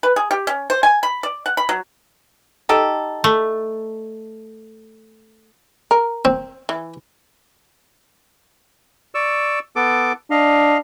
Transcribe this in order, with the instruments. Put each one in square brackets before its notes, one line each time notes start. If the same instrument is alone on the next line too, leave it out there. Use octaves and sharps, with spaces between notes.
[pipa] B4
G#4
G4
C#4
C5
G#5
B5
D5
F#5
B5
F#3
D#4 G4 A4
[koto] A3
[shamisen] A#4
[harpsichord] C4
[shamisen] E3
[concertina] D5 C#6 E6
B3 A4 D6
[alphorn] D4 [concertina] D#5 F5